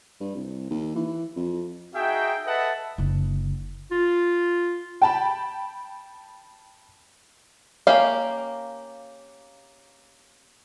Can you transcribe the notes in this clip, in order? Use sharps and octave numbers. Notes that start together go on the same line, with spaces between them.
G2
C2
D#2
E3
F2
D#4 F#4 G#4 E5 G5
A4 B4 D#5 E5 F#5 A5
F#1 D3
F4
G5 A5 B5
A#3 C#4 G4 F5